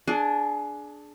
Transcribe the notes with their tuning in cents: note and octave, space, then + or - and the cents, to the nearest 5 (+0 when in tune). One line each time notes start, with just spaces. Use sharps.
D4 +0 G#4 +25